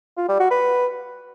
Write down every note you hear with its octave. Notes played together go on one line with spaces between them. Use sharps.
F4
G3
F#4
B4